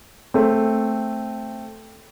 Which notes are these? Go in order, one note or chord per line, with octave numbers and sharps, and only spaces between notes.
A3 C4